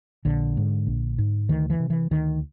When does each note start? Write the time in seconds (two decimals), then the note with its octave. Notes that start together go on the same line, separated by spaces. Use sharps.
0.25 A#1 D3
0.57 G#2
0.87 A#1
1.18 G#2
1.49 D2 D#3
1.70 E3
1.80 C3
1.90 E3
2.11 D2 D#3